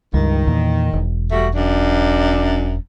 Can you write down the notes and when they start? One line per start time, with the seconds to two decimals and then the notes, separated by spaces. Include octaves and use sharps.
0.14 C#2 G2 D#3
0.47 E2 A#2
0.93 E1
1.31 G3 A3 F#4
1.55 F#2 D4